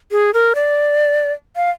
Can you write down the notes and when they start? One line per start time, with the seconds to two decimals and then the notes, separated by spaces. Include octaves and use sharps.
0.11 G#4
0.34 A#4
0.55 D5
1.56 F5